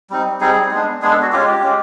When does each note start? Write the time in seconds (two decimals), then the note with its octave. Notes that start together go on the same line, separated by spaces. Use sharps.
0.10 G3 C4 D#4
0.40 G3 C4 D#4 G#4
0.71 G#3 B3 D4
1.02 G#3 B3 D4 G#4
1.12 A4
1.22 F#4
1.32 G#3 C#4 F4 G4
1.48 G4
1.64 G#3 C#4 F4